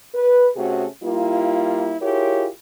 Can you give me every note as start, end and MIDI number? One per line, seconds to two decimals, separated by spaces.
0.15 0.49 71
0.56 0.85 48
0.56 0.85 57
0.56 0.85 61
0.56 0.85 66
0.56 0.85 68
1.03 1.95 55
1.03 1.95 58
1.03 1.95 64
1.03 1.95 65
2.01 2.45 64
2.01 2.45 65
2.01 2.45 67
2.01 2.45 68
2.01 2.45 70
2.01 2.45 73